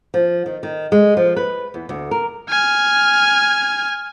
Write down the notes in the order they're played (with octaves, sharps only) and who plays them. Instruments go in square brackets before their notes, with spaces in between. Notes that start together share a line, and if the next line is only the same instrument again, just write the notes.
[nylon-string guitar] F3
D#3
D#3
G#3
F3
B4
E2
D2
A#4
[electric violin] G#5 F6